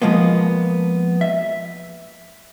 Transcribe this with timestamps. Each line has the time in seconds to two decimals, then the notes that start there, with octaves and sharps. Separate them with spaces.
0.02 F3 G#3 A#3 B3
1.21 E5